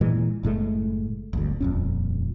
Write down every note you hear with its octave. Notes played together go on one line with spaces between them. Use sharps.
A#2 E3 G#3
F#1 A2 G#3 A3
D1 G1 D2
D#1 F2 C#4